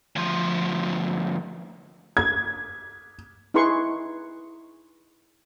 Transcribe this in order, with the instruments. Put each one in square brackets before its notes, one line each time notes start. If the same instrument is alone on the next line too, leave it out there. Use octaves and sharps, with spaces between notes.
[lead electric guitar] D2 F3
[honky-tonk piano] G#6
[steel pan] D#4 E4 G#4 B4 C6 C#6